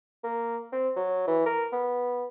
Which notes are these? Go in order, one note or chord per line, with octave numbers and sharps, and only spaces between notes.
A#3
C4
F#3
E3
A#4
B3